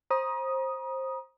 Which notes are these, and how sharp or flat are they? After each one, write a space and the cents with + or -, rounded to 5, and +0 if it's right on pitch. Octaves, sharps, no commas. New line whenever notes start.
C5 +20 A#5 +40 D#6 +0